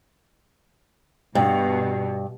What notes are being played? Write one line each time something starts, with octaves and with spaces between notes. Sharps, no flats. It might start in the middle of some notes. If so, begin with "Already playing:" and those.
G2 B2